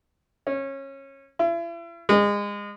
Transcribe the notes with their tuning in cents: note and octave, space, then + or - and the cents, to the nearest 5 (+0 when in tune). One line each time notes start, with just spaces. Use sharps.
C#4 -25
E4 +40
G#3 -25